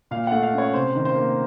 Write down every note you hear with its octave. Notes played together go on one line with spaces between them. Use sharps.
A#2 F5
A3 F#5
F5
C#4 C#5
C3 C5
D#3
C5
A#3